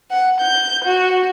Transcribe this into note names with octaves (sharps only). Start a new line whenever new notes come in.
F#5
G6
F#4